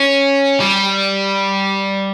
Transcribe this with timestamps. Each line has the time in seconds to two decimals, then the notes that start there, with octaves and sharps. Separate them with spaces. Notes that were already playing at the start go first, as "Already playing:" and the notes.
Already playing: C#4
0.60 G3